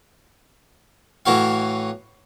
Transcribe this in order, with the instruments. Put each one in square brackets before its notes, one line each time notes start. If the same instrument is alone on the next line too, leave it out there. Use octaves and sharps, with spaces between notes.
[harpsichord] A2 E3 F#4 F5